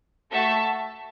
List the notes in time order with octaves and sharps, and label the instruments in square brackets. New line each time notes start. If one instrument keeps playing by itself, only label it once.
[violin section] A3 F#4 A4 E5 A5